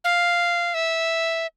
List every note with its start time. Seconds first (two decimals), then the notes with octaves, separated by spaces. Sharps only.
0.04 F5
0.74 E5